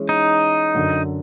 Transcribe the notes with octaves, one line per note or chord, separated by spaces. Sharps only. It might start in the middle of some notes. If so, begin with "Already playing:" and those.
Already playing: E3 G#3 C#4
D#4
F#2 D3 F#3